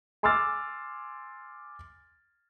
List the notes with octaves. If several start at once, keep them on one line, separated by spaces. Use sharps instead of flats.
G#5 C6 D6 E6 F6 A6